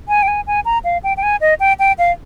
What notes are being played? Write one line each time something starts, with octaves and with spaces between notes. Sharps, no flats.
G#5
G5
G#5
G#5
A#5
F5
G5
G5
G#5
D#5
G5
G5
F5